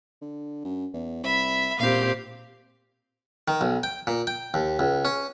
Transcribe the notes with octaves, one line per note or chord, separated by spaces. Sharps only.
D3
F#2
E2
C2 E5 B5
E1 A#2 C4 G4 F5
D#3
B1
G5
A#2
G5
D#2
C#2
C#4